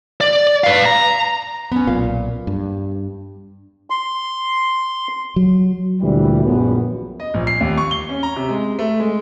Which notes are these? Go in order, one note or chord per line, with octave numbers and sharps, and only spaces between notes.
D5
B4 F5
A#5
B3 C#4
B1 A#2 F5
G2
C6
F#3
D2 A#2 E3 G3
A#1 F#2 B3
D#5
A#1
C7
D#2
C#6
G7
C#4
A#5
C3
G#3
A3
G#3